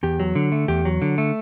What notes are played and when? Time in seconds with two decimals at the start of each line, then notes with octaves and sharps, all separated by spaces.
0.03 E2 G4
0.20 F#3
0.35 D3
0.52 A3
0.68 E2 G4
0.85 F#3
1.02 D3
1.18 A3